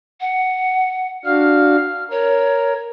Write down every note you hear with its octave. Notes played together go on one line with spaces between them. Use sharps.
F#5
D4 F#4 F5 F6
A#4 C#5